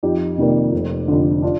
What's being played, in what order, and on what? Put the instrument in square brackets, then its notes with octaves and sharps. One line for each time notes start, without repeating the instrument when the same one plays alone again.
[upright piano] F2 D#4 G4
C3 D#3 G3 A#3
F1
F2 D3
D4 F4